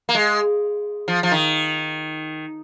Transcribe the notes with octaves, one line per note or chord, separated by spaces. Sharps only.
A#3
G#3
F3
F3
D#3